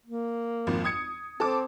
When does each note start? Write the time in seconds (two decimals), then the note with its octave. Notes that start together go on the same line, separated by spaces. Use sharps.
0.06 A#3
0.67 G#1 F2
0.84 D#6 G#6 C#7
1.40 C4 A4 A5 D6